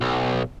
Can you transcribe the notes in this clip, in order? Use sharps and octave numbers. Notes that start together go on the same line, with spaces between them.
B1